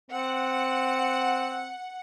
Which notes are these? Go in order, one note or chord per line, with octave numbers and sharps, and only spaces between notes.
C4 F#5